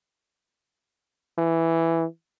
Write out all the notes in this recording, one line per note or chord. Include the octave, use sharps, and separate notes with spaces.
E3